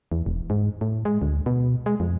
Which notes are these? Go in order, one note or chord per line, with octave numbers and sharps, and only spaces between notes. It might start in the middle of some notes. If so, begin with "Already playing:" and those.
E2
E1
G#2
A2
G#3
D2
B2
G#3
F2